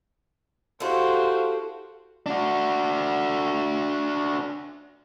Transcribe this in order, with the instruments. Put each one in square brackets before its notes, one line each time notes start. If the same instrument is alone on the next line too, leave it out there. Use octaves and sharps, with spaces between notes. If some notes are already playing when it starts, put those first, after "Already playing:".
[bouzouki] E4 A4 [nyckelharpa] F#4 G4 [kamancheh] C5 F5
[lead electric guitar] D4 F#4